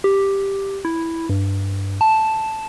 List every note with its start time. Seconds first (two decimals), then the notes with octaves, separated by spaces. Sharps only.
0.04 G4
0.85 E4
1.29 G2
2.01 A5